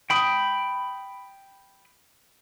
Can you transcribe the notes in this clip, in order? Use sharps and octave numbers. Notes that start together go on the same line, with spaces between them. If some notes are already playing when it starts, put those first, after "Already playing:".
G5 B5 D#6